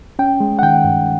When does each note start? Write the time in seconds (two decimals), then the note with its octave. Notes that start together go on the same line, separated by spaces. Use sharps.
0.19 C#4 G5
0.40 G#3
0.59 F#5
0.62 D#3 G5
0.84 G2